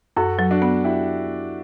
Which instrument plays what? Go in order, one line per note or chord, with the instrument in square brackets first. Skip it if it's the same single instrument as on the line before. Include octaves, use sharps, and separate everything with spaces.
[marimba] F#2 [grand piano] F#4 A4
[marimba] F#3
[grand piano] D4 F#4
[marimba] B3
[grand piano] E4 G4